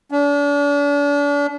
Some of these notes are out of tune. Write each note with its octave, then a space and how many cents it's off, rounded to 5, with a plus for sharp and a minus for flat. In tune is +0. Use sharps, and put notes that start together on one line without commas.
D4 -40